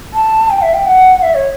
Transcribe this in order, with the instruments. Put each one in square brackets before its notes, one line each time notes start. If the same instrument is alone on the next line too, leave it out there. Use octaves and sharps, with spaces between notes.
[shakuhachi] A5
G5
E5
G5
F#5
E5
C#5